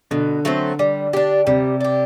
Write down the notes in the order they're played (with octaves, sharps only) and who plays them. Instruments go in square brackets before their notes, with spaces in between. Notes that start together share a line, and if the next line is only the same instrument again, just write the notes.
[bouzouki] B2 [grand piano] D3
[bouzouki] F#3 A3 C4
G3
D4 G4
[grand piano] C3 [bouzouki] G3
[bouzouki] D4 G4